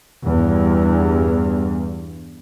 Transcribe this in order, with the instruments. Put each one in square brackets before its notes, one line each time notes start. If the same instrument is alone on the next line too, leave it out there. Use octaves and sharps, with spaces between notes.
[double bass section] E2 G2